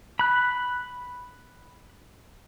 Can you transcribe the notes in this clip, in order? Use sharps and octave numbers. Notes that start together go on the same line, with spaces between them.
B5 F#6